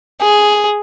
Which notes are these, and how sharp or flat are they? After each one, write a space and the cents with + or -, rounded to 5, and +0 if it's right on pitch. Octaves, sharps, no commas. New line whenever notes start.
G#4 +5